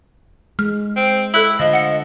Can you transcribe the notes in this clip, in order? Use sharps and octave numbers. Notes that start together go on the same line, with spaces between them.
G#3 F6
C4
E4 A4 F#6 F#7
D3 F3 D#5
F#5 C#7